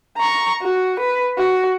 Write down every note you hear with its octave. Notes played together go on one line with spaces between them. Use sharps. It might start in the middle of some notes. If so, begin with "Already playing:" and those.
A#5 C#6
F#4
B4
F#4